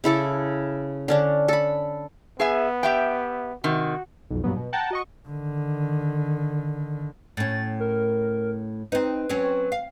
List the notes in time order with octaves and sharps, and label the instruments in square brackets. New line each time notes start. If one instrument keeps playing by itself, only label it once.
[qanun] C#3 E4 A4 D6
D3 C#4 D4
A4 B5
[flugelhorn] B3 [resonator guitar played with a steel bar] G#4 E5 G#5
[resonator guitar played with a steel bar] G4 E5 G5
[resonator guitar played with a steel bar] C3 D#3 [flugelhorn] F#4
[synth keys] B1 F2
G2 A#2 F#3 B3
B2
F#5 G5 A5 A#5
F#4 D#5 C#6
[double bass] D3 D#3
[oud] A2 C#4 [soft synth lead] A6
[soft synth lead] A#4
[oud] C4 D#4 [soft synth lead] B4
[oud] F#3 C4 C#4
F5